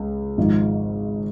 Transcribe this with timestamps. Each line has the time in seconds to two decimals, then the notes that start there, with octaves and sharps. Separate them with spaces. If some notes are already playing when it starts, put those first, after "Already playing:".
Already playing: C#2 C#3
0.37 G#1 G#2 F3